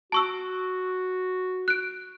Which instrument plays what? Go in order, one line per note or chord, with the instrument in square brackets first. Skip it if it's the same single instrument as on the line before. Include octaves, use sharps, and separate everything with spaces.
[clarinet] F#4 [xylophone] A5 C#6 E6
[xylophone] F#6 D7